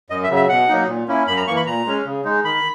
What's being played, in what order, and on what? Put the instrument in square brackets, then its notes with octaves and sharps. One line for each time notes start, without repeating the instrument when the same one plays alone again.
[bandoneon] F#2 D#5
E5
C#3 F#3
E5
B2 F#5
F#3 A#3 D#4
A#2
A#3 C#4 E4
F#2 B5
A#5
E3 A#3 C#6
B5
A#2 A#5
G#3 C#4
C#3
G#3 D#4
D#3 B5